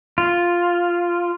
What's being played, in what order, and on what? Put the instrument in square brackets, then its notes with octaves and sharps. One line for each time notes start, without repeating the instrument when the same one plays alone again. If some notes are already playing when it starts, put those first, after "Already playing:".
[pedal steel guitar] F4